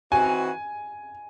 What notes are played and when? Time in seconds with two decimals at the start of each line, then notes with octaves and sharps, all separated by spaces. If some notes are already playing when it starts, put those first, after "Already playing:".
0.12 E3 C4 D#4 F#4 G#5